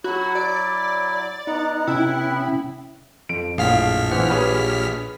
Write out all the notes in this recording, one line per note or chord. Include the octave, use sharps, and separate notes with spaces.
F#3 E4 F#4
D5
B3 D#4 D#5 F#5 A#5
C3 C#4 E4 G5
F2 D7
A#1 F#2 A2 G#4 F5 F6 B6
E3 B3 C5 F#5
G4 G#4 B4 C#5 B5